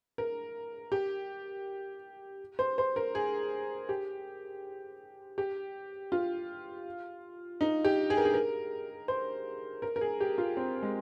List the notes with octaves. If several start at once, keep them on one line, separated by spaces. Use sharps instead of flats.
A#4
G4
C5
C5
A#4
G#4
G4
G4
F4
D#4
G4
G#4
A#4
G#4
A#4
C5
A#4
A#4
G#4
G4
F4
C4
G#3